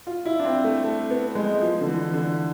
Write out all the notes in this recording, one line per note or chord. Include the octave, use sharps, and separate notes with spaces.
F4
E4
D4
C4
A3
A3
B3
G#3
F3
D3
E3
D3